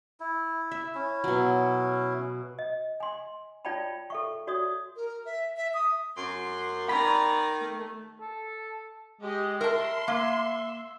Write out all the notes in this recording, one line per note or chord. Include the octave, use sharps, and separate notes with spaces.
E4
E5
C#4 E4
B2 F#3
D#5
G#5 C6
F4 C#5 D5 G5 A5 B5
A4 E5 C#6
F#4 C#5 D5 D#6
A#4
E5
E5
D#6
F#2 C6
D#3 D5 A#5 B5
A3
A4
G#3 G4 D#5
A#4 E5 A5 C6
A#3 E5